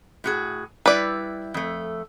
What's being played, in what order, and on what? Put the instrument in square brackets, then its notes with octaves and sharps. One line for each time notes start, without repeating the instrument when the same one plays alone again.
[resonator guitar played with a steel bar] A2 F#4 G#4
[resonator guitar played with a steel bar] G3 E4 [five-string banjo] B4 D5
[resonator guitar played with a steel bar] F2 A3